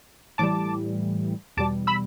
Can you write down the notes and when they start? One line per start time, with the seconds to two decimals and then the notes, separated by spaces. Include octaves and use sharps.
0.38 A2 E3 G3 A5 D6
1.57 E2 B2 G3 A5 D6
1.87 B5 E6